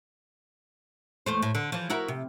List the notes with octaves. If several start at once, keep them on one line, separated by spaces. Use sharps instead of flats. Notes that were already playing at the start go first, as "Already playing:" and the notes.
E2 A3 C5
A2
D3
E3 F3
E4 F#4 A#4
C3